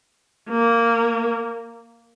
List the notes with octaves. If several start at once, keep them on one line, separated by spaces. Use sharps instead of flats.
A#3